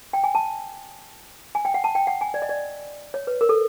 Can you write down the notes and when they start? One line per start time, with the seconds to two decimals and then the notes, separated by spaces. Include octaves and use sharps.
0.13 G5
0.24 G#5
0.35 A5
1.55 G#5
1.65 G5
1.74 F#5
1.84 A5
1.95 G5
2.07 F#5
2.21 G#5
2.34 D5
2.42 D#5
2.49 D5
3.14 C#5
3.27 B4
3.41 A#4
3.49 A4